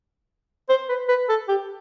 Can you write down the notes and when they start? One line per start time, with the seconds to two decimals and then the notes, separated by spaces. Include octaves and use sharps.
0.69 C5
0.89 B4
1.08 B4
1.29 A4
1.49 G4